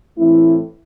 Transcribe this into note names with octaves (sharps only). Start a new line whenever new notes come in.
A2 E3 A3 C4 E4